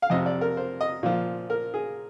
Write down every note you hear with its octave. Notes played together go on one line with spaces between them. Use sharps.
F5
F2 C3 F3 D#5
D5
A#4
C5
D#5
A#2 F3
A#4
G#4